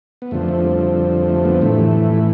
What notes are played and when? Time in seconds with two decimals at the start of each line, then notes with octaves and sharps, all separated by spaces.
0.22 B3
0.31 F2 D3 F3 A3
0.49 A3
0.64 G3
1.30 A3
1.45 G3 B3
1.62 A2 E3 A3